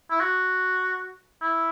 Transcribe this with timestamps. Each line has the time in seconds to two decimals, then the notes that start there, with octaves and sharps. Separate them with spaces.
0.11 E4
0.21 F#4
1.42 E4